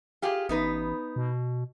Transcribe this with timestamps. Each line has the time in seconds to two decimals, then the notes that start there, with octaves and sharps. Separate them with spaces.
0.22 F4 G4 G#4
0.49 A1 B3 D#4 B4
1.16 B2